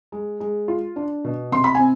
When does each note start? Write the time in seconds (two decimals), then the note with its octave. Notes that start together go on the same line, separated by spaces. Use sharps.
0.12 G#3
0.40 G#3
0.68 F4
0.96 D4
1.24 B2
1.52 C3 C6
1.64 B5
1.75 C4 G#5